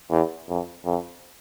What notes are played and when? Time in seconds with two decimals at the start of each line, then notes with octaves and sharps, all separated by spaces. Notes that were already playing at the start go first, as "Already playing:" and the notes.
0.10 E2
0.48 F2
0.85 F2